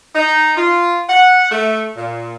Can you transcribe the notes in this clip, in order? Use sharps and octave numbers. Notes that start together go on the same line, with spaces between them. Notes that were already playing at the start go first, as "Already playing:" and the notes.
D#4
F4
F#5
A3
A#2